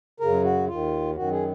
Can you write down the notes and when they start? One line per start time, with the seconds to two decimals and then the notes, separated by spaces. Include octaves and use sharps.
0.20 F#2 C#3 A#4
0.44 F#4
0.67 D#2 D#3 F4
1.16 F#2 D#3 F#4
1.31 G#4